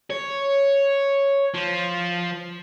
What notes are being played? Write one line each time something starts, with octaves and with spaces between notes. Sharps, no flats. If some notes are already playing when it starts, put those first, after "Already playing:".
C#5
F3